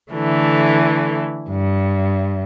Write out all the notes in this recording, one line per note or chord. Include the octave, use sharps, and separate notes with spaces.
D3 E3 A3
G2